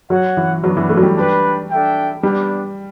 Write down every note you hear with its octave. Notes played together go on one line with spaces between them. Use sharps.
F#3 F#4 C#5 F#5
E3
F#3 B3 D4 F#4
E3
A3
F#3
G3
D4 G4 B4
D4 A4 E5 G5
G3 B3 D4 G4